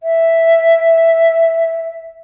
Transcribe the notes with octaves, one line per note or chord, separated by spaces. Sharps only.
E5